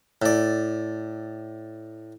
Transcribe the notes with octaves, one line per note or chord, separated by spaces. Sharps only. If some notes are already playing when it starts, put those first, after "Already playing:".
A2 D5